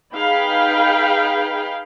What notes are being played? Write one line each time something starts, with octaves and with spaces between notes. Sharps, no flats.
D#4 G#4 B4 F5 G5 B5